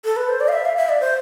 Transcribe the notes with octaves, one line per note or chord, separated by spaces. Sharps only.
A4
B4
C5
D5
F5
E5
F5
E5
D5
C5